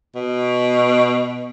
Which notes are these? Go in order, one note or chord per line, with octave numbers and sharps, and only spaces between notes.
B2